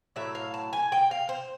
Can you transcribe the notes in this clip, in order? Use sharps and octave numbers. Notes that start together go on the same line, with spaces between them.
A2 F#3 E5
F5
A5
G#5
G5
F5
C5